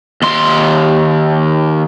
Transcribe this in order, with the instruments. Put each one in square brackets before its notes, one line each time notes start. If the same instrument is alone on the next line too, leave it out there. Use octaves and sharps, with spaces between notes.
[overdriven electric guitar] D#2 C6